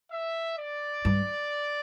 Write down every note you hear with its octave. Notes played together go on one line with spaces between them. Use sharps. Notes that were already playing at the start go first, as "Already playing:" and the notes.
E5
D5
G2